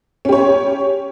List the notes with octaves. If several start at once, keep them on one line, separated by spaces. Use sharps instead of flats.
C#4 G4 C#5